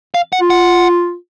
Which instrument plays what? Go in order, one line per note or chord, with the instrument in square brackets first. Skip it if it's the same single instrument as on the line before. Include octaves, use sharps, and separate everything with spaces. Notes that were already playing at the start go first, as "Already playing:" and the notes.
[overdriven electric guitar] F5
F#5
[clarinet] F4
[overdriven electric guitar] F#5